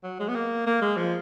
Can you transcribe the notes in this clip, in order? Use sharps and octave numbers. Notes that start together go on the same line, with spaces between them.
F#3
G#3
B3
A#3
A#3
G#3
F3